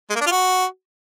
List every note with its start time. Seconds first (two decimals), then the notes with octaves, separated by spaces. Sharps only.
0.10 G#3
0.15 A#3
0.21 D4
0.26 F4
0.32 F#4